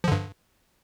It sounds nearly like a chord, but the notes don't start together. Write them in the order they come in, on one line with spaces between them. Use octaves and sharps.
F3 D3 G2